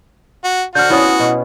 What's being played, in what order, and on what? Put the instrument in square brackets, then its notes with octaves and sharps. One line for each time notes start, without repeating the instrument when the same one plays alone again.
[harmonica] F#4
[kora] D3 C5 [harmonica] F#4 [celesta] F6 G6
[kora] B3 C#4 F4 [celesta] E4 F#5 D#6
[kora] B2